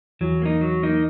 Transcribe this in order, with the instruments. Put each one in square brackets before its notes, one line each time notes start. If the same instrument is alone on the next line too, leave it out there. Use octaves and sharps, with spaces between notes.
[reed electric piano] E2 E3 [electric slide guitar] F#3
[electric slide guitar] A#3 D#4
F#3
A#3 D#4